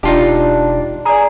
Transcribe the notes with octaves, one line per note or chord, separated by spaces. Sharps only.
E1 D4 D#4 F4 G4
G#4 D5 A#5